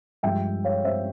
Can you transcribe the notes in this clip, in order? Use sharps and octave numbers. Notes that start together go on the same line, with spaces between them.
G2 F3 G#3 E5 G5
C#5 F5
C5 E5